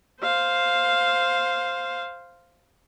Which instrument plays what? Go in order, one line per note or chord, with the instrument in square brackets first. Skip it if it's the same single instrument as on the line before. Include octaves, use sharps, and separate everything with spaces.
[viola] C5 F5